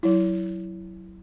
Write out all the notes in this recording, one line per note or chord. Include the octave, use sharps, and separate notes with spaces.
F#3 E4